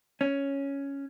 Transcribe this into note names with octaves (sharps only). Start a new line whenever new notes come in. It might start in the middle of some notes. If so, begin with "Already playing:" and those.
C#4